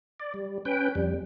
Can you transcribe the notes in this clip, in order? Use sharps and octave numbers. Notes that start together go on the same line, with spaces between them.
D5
G3
C#4 B4 G5
F2 G3